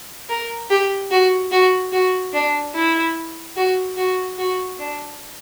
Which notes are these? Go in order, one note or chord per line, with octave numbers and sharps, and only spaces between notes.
A#4
G4
F#4
F#4
F#4
D4
E4
F#4
F#4
F#4
D4